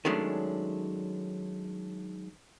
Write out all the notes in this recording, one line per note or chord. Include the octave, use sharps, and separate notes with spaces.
D#3 F#3 G#3 A3 C#4 D4